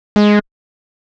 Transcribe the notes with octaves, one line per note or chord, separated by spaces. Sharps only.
G#3